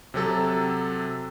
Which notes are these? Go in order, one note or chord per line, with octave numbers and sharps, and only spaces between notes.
C3 F#3 A4 A6